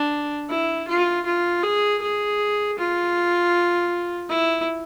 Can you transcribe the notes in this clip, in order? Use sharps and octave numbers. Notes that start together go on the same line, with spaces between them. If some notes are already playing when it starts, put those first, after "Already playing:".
Already playing: D4
E4
F4
F4
G#4
G#4
F4
E4